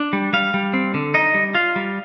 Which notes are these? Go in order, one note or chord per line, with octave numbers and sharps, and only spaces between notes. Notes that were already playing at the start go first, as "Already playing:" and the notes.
Already playing: D4
G3
G3 F5
G3
C4
D3
D#4 D#5
G3
F4 F5
G3